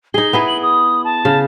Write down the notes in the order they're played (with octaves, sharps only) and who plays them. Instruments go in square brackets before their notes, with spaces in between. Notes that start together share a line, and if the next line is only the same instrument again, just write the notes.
[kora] D#4 G#4 [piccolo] G7
[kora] B3 E4 G#4
[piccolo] F#7
D#6
A5
[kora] C#3